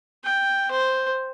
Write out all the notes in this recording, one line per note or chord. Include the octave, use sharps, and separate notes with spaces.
G5
C5